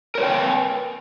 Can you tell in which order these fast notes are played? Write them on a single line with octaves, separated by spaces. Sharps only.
A#4 C#5 B4 G5